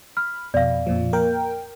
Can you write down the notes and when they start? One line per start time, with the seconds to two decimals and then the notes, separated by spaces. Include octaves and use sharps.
0.17 B5 F6
0.54 F2 B2 D5 F5
0.87 F2 A#2 F3
1.13 A#3 A#4 G5